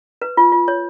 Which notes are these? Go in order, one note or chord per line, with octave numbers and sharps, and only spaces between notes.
B4
F4
F4
C#5